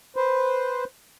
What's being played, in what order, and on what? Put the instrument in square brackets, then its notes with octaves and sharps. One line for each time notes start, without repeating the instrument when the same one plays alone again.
[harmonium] B4 C5